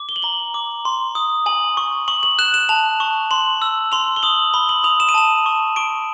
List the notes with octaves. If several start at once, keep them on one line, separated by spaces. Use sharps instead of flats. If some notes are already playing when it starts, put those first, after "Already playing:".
Already playing: D6
G7
F#7
A#5 G7
D6
C6
D#6
G#5 F#7
C#6
C#6 F#7
F#7
F#6 E7
E7
A5 F7
C#6
C6 F#7
E6
C6 F7
G7
D#6 F#7
B5 G7
F#7
D#6 F7
E7
D#7
A5 E7
C#6
C#6 D7